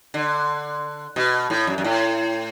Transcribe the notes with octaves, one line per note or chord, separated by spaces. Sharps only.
D3
B2
A2
F#2
F#2
A2